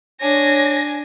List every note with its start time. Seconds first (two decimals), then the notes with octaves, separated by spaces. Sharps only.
0.21 D4 C#5 G#5 A#6